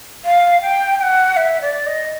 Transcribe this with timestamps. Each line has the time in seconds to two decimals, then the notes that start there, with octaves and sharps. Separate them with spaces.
0.25 F5
0.62 G5
0.99 G5
1.03 F#5
1.37 E5
1.62 D5
1.86 D#5